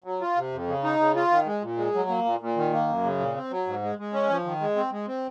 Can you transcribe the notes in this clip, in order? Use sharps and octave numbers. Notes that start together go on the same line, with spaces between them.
F#3
F4
C3
F2
C#3
D#4
C#3
F4
D#3
G#3
A#2
G#3
F#3
A#3
A#2
A#2
D#3
A#3
F#2
C#3
A#2
C4
F#3
G#2
G#3
G#3
C#4
F3
D#3
G#3
C4
G#3
C4